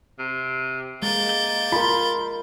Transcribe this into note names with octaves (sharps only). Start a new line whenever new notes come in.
C3
G#3 A#3 G6 A6
F4 A#4 B5